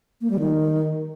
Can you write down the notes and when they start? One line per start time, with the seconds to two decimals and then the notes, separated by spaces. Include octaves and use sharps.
0.21 A#3
0.30 G3
0.39 D#3